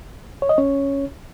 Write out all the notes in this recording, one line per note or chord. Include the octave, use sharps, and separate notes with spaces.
C#5
D#5
C#4 C#5